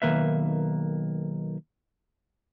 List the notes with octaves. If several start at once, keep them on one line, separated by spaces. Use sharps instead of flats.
B1 F2 D#3 A#3 B4 E5